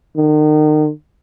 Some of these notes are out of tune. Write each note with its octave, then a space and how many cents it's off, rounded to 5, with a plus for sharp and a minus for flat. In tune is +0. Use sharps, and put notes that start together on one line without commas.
D#3 -35